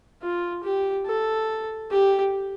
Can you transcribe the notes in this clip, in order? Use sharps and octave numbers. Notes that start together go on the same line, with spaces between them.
F4
G4
A4
G4